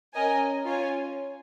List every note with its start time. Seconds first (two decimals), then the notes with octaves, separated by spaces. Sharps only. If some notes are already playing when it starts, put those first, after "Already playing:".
0.14 C#4 A#4 D#5 G#5
0.64 C#4 F4 C#5 G#5